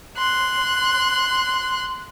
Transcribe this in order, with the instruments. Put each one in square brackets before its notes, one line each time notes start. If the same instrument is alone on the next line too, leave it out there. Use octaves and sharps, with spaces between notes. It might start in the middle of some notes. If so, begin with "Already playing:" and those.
[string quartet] C6 F#6